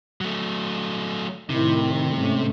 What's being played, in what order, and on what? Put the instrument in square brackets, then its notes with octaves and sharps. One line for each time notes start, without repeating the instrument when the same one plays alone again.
[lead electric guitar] F#3 A3
[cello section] A2 D#3 E4 [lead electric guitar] C3
[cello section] G#2 A3 C#4